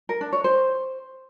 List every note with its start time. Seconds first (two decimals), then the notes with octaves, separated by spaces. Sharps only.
0.09 A#4
0.21 D4
0.33 C#5
0.44 C5